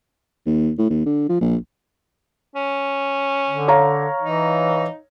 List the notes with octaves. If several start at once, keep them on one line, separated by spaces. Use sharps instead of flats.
D#2
A2
D#2
D3
F3
A#1
C#4
D3
C#5 F5 A#5
E3 D#4